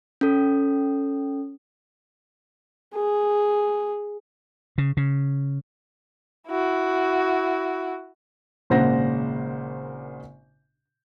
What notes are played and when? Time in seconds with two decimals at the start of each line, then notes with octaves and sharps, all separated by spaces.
0.21 C#4 A4
2.95 G#4
4.78 C#3
4.97 C#3
6.48 E4 F#4
8.70 G#1 A#2 C#3 C5 F#5 A#6